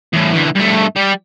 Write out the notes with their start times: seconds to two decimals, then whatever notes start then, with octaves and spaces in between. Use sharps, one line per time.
0.13 E2 A2
0.33 D2 E3
0.55 G2 A3
0.96 G3 G4